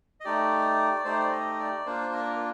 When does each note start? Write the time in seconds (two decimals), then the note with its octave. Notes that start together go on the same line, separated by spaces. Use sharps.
0.20 D#5
0.25 A3 D#4 G4 D5
1.05 A3 D#4 G4 C5
1.20 D5
1.32 D#5
1.59 D5
1.86 A#3 D4 F4 C5
2.13 A#4